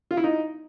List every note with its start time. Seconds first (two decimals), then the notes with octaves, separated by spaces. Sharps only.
0.11 F4
0.17 E4
0.24 D#4